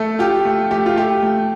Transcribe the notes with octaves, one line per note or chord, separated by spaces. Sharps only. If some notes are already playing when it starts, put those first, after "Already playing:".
Already playing: A3 A4
F4 G4
A3
A3 G4
F4
A3 G4
A3